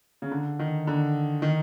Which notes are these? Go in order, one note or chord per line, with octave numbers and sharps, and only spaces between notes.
C#3
D3
D#3
D3
D#3